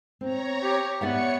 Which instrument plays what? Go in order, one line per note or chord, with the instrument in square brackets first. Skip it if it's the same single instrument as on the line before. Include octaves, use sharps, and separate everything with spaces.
[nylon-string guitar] C4 [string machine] C#5 A#5
[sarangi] G4
[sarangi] B3 [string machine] C#5 C#7 [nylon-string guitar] D5 E5 F#5